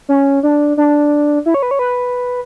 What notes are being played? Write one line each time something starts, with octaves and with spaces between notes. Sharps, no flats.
C#4
D4
D4
E4
C#5
B4
C#5
B4